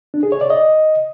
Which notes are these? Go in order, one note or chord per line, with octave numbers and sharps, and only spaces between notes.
D4
G#4
C#5
D5
D#5